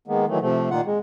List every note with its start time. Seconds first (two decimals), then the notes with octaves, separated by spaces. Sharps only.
0.08 D#3 G#3 A#3 B3
0.29 D#3 E3 F#3 A3
0.41 C3 F3 A3
0.71 A#2 D#3 A#3 F4 F#5
0.86 G#3